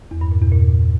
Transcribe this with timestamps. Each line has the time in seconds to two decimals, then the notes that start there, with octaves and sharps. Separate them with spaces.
0.11 E2
0.21 G2
0.31 A#2
0.42 E2
0.52 A#2